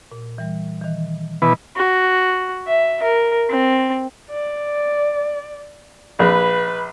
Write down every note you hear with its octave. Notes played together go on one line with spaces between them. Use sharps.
A#2
E3 G3
D#3 E3
B2 D#3 E3 B4
F#4
E5
A#4
C4
D5
A#1 B4